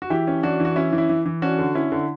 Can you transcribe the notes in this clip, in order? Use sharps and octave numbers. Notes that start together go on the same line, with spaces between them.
F#4
E3 E4 G4
C#4
E3 D4 F#4
E3 F#4
C#4 E4
E3
E4
E3
E3
C#4 D4 F#4
D3
C#4 E4
D3